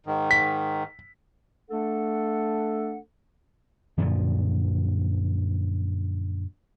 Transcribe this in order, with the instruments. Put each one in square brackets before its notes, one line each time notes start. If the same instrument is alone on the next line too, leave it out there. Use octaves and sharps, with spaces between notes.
[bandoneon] G#2 D#3
[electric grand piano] B6
[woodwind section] A3 D4 A4 F#5
[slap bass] F#2 A#2 D3 F3